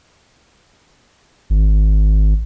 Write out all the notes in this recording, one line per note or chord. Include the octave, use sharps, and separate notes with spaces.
G#1